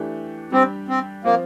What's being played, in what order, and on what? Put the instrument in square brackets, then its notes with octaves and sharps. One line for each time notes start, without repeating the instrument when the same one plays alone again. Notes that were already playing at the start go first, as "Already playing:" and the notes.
Already playing: [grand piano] E3 A3 D4 G4
[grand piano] G3 D4 G4 [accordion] C4
[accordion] C4
[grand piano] F3 C4 F4 [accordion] A#3